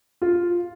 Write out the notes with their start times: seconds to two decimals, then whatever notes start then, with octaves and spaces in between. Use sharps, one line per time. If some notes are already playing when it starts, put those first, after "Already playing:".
0.22 F4